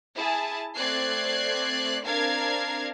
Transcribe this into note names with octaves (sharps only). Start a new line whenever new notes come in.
E4 G#4 A5
A3 C4 D5 F#6 G#6 C7
C4 D4 A#4 F5 G#6 C7